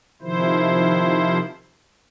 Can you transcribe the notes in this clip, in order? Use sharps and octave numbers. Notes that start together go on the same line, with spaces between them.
C3 D#3 F3 E4 C5